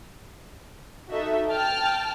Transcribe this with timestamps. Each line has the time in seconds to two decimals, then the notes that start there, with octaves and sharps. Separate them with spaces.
1.10 D#4 F#4 A4 D#5 E5
1.49 G5 A5 F6